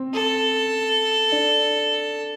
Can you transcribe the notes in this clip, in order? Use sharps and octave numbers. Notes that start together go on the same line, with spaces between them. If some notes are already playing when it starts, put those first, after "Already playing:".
Already playing: C4
A4
D4